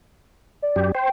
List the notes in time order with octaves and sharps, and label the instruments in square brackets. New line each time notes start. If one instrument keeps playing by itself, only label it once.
[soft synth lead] D5
[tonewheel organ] F#2 G4
[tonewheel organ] C5 [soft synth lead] G5